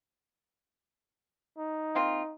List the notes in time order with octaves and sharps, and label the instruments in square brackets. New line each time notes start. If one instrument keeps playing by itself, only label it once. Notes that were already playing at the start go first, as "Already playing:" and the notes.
[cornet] D#4
[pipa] A#3 C4 F4